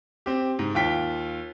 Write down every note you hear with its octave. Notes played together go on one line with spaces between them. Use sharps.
C4 G4
G#2
D#2 F4 G5 B6